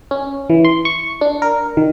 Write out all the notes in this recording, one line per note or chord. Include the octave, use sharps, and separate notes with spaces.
C#4
E3
C6
C#6
D4
A#4
D#3